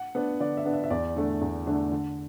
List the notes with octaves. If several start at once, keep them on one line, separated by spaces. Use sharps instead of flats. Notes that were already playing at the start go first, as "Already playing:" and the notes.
Already playing: F#5
B3 D4
D3 D5
E5
B3 D4
E5
E5
E2 D5
D3 A3 D4
E2
D3 A3 D4
D3